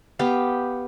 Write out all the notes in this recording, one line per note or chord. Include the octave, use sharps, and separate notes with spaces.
B3 G4 F5